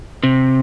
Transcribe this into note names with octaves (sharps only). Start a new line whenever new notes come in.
C3